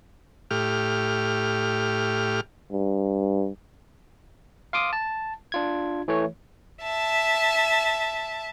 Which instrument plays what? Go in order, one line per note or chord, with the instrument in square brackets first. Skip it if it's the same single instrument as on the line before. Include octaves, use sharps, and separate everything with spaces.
[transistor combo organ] A2 G4 F6
[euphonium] G2
[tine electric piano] F5 C6 D6 D#6
A5
D4 F4 G#6
E3 A3 C#5
[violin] E5 A5